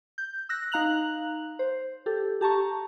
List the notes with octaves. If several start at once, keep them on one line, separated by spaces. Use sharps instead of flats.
G6
E6 F#6 A#6
D#4 F5 A#5 F#6 F7 F#7
C5
G4 A4
G4 A5 A#5 C#6